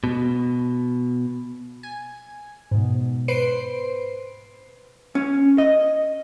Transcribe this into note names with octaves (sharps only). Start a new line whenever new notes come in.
B2
G#5
G#2 B2
B4 C5 C7 D7
C#4
D#5